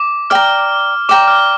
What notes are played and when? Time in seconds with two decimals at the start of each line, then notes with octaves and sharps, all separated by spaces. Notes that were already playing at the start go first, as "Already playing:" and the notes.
Already playing: D6
0.30 D5 G5 A#5 F6
1.09 D5 G5 A#5 D6
1.28 F6